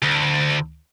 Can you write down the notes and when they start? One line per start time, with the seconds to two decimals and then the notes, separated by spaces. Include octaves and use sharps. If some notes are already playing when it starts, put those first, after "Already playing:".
0.02 D2